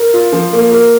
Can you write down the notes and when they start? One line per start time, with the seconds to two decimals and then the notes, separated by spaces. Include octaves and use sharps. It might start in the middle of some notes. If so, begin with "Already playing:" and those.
Already playing: A#4
0.14 F4
0.32 F3
0.53 A#3
0.72 A#4